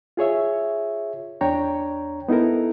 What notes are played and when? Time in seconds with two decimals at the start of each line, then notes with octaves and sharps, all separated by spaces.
0.17 F4 G#4 C#5 E5
1.41 E2 D4 C#5 G5 A#5
2.28 B3 D#4 E4 A4 A#4